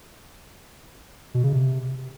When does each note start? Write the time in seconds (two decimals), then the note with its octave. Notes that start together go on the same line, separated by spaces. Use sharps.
1.34 B2
1.44 C#3
1.53 C3